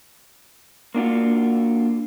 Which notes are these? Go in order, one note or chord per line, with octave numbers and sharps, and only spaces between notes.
A#3 D4 F4 F#4